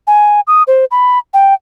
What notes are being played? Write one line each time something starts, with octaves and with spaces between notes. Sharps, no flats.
G#5
D#6
C5
B5
G5